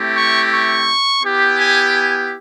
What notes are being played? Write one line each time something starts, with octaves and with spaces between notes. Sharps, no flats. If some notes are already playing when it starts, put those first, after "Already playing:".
Already playing: A3 C4 E4 G4
C#6
C#6
B3 E4 G4
G#5
G#5